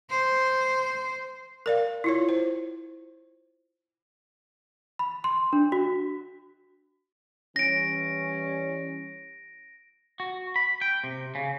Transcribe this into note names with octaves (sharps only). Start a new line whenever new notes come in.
C5
A#4 D5 F5
E4 F4 C#5
C5
B5
C6
D4
F#4
E3 G3 C#4 A#6 D7
F#4
B5
G5
C3
C#3